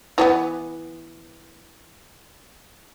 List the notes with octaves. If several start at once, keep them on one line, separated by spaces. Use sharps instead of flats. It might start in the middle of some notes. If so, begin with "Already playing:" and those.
E3 G#3 B3